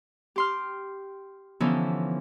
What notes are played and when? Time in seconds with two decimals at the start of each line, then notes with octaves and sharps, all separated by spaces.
0.36 G4 C6 F6
1.60 D3 E3 F3 B3 C#4 D#4